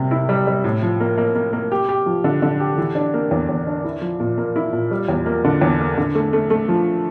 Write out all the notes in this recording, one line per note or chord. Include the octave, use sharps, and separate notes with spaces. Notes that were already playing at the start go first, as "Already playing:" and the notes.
Already playing: C3 G3 A#3
E4
G3
G3
A2
F3
A#3
A#3
A#3
A#3
G4
G4
F3
D3
D3
G4
E3
D4
A#3
E2
E2
D4
E4
F3
A#2
A#3
E4
A#2
G3
E2
A#3
D3
E2
A#3
D3
A3
A3
A3
F3